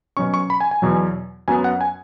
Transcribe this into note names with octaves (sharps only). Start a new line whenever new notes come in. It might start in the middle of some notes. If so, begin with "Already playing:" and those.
B2 F#3 C#4 C#6
C#6
B5
G#5
G#5
E2 B2 F#3
F#2 F#3 B3 G#5
F#5
G#5